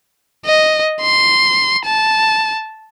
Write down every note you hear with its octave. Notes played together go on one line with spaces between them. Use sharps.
D#5
C6
A5